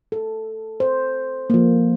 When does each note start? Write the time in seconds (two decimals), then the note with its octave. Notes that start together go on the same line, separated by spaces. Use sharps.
0.12 A4
0.80 C5
1.50 F3 A#3